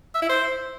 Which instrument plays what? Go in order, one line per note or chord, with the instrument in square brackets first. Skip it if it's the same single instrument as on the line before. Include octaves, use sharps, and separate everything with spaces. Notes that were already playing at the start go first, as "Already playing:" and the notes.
[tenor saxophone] E5
E4
C5